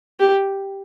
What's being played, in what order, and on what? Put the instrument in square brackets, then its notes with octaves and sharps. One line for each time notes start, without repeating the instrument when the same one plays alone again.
[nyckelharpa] G4